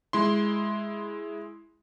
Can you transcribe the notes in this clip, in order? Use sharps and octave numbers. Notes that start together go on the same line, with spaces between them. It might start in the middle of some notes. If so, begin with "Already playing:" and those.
G#3 E4 C6